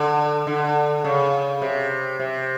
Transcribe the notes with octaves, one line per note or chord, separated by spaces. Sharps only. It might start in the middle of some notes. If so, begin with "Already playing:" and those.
Already playing: D3
D3
C#3
C3
C3